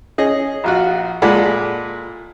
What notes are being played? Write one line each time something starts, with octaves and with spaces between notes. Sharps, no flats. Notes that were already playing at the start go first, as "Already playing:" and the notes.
C#4 G#4 D#5
A#1 F4 F#4
A#2 G#3 A4 D5 F#5 B5